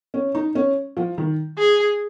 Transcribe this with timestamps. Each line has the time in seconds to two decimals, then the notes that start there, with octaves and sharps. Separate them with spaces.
0.14 C#4
0.35 D#4
0.55 C#4
0.97 F3
1.18 D#3
1.58 G#4